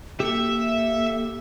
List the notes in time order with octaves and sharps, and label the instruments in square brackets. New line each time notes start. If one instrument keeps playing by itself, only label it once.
[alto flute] A#3 [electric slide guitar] G4 A4 [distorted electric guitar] E5